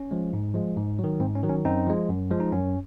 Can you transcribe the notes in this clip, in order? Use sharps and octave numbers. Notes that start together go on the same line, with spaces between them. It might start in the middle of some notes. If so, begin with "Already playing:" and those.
Already playing: C#4
F3 G#3
G#2
F3 G#3
G#2
D#3 F#3
G#2 C4
C#4
D#3 F#3
C#4
F#2 C4 D#4
F3 G#3
F#2
F3 G#3
D#4
F#2 C#4